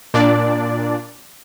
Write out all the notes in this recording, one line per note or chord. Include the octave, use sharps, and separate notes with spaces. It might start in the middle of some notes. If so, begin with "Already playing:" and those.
A#2 D4 D5